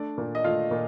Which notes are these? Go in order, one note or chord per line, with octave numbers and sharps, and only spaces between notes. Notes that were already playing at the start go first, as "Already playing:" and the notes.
Already playing: A3 D4 D5
A#2
D#5
A3 F4 F5
A#2